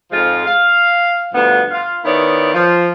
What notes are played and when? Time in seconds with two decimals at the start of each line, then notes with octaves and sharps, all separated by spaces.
0.12 F2 G#2 F3 G#3 F4
0.46 F5
1.33 D2 G2 F3 B3
1.71 F4 F5
2.04 D#3 B3 E4 C#5 D5
2.53 F3